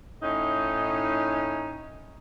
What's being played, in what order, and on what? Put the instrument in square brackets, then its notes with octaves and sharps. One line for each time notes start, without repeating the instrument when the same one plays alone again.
[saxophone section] A2 C#4 D#4